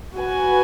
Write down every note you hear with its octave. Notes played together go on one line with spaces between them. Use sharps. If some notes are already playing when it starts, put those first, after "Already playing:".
F#4 B4 G#5